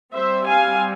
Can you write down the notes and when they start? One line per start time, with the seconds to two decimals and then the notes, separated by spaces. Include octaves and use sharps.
0.13 G3 C4 C5 E5
0.47 F5 G#5